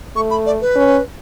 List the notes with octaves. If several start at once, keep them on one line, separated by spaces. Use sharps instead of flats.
A3 C#6
B5
D5
B4
C#4